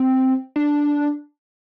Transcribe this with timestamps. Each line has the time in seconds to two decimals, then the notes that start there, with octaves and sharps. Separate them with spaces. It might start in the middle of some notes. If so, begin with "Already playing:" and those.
Already playing: C4
0.56 D4